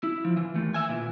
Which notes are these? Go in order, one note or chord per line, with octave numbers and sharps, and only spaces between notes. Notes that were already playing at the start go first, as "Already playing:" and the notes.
E4
F3
E3
D#2 A3
E5 G#5
A#2 E3